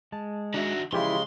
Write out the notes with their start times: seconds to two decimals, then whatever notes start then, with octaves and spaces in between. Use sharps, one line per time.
0.12 G#3 A5
0.54 D#3 D4 F#4 E5
0.93 C#3 E3 F3 G#3 E4 F4 G4 C6